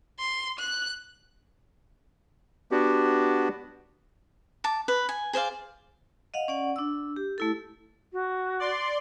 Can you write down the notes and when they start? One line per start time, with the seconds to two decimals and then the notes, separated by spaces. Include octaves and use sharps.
0.19 C6
0.59 F#6
2.71 B3 D4 F#4 G4
4.64 A5 D6
4.88 B4
5.09 G#5
5.33 G#4 C5 D5 F5
6.34 D#5 F5 F#5
6.48 C#4 D5 F#5
6.76 D4 E6
7.16 G4
7.38 A3 E4 A4
8.12 F#4
8.60 D5 C6